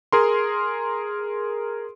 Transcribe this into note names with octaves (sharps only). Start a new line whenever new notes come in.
G#4 A#4 C6